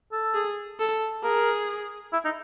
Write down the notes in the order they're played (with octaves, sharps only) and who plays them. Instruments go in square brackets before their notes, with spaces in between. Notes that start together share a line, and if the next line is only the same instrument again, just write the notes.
[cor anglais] A4
[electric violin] G#4
A4
[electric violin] G#4 [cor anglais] A#4
[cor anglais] E4
D#4